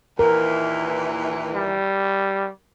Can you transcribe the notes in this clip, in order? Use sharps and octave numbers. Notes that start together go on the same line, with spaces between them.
D#2 A#2 E3 A#4
G3